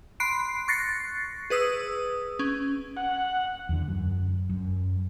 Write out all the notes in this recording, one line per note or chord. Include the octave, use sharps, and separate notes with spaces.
B5 C6 F#6 C7 D7
C#6 F#6 A6 A#6 C7 C#7
G#4 B4 D#6 E6
C#4
F#5
E2 D3
F#2
F#2